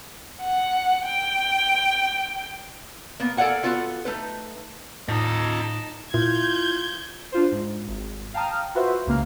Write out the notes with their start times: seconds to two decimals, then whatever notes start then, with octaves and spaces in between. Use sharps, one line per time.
0.41 F#5
1.05 G5
3.20 A#3 B3
3.37 A4 A#4 D5 F5 F#5 G#5
3.63 B3 F4 F#4 A4 B4
4.05 A3 D#4 B4
5.08 A2 D#4 F4 D#5 A5
6.14 A#2 E4 F4 G6 G#6
7.32 D4 F4 C5
7.51 G#2
7.88 G#1
8.34 F5 G5 A5 A#5 D#6 F6
8.75 F4 F#4 B4 C5 E5
9.06 C#2 C#3 A#3 F5